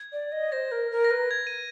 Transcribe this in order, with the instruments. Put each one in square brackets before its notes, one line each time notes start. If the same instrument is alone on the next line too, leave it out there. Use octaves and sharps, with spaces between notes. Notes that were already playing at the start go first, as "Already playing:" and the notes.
Already playing: [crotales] G#6
[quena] D5
D#5
[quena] C5 [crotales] A#6
[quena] A#4
A#4
[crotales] A#6
[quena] B4
[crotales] G#6
D#7